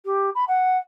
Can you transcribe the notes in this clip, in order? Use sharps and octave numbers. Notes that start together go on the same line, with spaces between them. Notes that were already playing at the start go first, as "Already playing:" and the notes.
G4
B5
F#5